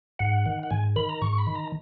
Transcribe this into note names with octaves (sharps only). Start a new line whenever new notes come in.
G#2 F#5
D#3
F#5
G#2 G#5
D#3 B5
A#5
G#2 C#6
B5
D#3
A#5